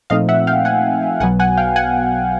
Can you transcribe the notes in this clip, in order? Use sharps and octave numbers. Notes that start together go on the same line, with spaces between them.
A#2 F3 A3 C4 D#4 D#5 F5
E5 F#5
F5 G5
F#5 G#5
B1 B2 F#3 B3 F#5 G#5
F#5 G#5
F5 G5
F#5 G#5